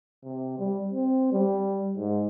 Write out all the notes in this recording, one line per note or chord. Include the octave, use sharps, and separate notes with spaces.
C3
G3
C4
G3
G#2